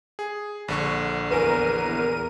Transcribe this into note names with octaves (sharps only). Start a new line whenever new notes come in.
G#4
A#1 D3 C#6
E2 A#4 B4 G#5 D#7